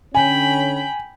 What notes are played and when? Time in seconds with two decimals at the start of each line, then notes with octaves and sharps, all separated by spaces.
0.15 D3 C#4 G5 G#5 B5